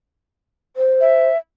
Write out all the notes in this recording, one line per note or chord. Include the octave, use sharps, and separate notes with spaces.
C5
E5